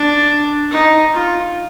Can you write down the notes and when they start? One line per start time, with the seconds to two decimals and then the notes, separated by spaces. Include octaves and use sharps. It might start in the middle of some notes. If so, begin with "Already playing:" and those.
Already playing: D4
0.71 D#4
1.13 F4